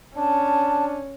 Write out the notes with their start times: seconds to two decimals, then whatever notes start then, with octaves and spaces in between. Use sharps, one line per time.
0.17 C#4 D4 A5